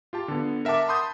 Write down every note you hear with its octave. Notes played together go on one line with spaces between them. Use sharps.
F4 G4 A5
D3 B3
A#4 E5 F#5 A5 D6
A5 B5 C6 D#6 G6